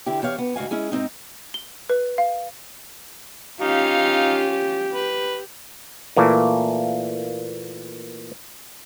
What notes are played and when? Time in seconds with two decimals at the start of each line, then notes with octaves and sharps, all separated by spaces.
0.06 D3 E4 G4
0.22 E2 G4 C#5 F5
0.38 B3
0.56 D2 G#2 F#4 F5 G#5
0.71 G#3 C#4 E4 G#4
0.92 G#2 E3 C4 D#4
1.54 G7
1.90 B4
2.18 F5
3.61 C#4 D#4 F4 G4 F5
4.92 B4
6.17 A#2 E3 A3 A#3